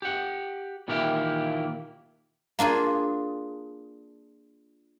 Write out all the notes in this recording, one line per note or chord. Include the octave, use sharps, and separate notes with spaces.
G4 F#5
A#2 D#3 E3 A#3 E4 G4
A#3 D4 F4 G#4